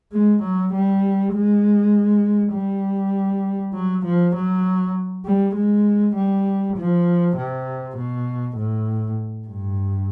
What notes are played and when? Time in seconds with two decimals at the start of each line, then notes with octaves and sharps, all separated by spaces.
0.12 G#3
0.43 F#3
0.73 G3
1.34 G#3
2.53 G3
3.74 F#3
4.05 F3
4.36 F#3
5.26 G3
5.56 G#3
6.16 G3
6.77 F3
7.37 C3
7.97 B2
8.57 A2
9.48 G2